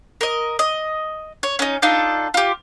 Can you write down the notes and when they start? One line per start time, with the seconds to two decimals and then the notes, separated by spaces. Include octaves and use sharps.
0.21 A#4 D#5
0.59 D#5
1.43 C#5
1.59 C#4 D#4
1.82 D4 D#4 F4 A4
2.34 F4 G4